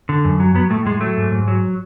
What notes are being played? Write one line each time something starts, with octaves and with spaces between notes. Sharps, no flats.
D3
F#2
F#3
F#3 B3
A2 A3
A2 G#3
F#3 A3
G#2
G#2
F#3